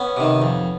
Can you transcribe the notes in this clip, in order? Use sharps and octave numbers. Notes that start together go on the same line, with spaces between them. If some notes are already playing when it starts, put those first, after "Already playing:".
Already playing: B3 C#4
C3 D#3
F2